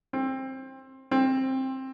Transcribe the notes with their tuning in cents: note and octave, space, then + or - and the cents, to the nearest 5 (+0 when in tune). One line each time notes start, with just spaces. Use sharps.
C4 +20
C4 +15